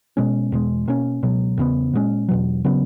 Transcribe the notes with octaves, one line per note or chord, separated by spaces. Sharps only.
B2 G#3 C#4
E2 B2 G#3
B2 A#3 C#4
C#2 B2 F#3
E2 C#3 G#3 B3
A#2 G#3 C#4
E2 B2 F#3
C#3 F#3 B3